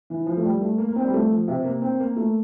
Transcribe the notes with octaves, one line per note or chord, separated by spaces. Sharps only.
E3
F3
A3
G3
A3
A#3
A#3
C4
G3
A3
F3
C3
A#3
C4
A#3
A3